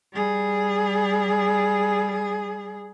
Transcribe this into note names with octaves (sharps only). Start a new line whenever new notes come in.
G3 G#4